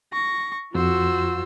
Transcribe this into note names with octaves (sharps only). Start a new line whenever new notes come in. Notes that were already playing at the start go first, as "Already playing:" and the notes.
C#6 A#6
F2 F4 F#4 C5 E6